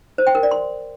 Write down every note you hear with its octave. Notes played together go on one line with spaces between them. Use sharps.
C5
G5
A#4
D5
C6